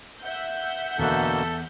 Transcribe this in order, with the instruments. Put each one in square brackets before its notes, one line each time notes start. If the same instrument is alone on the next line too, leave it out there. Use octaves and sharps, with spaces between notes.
[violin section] E5 F#5 G6
[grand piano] E2 F#6 [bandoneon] B2 D3 A#3 [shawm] A4